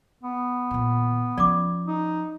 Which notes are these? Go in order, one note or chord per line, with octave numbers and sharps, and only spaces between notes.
B3
A#2 D#3
F3 C#4 D5 D6
D#4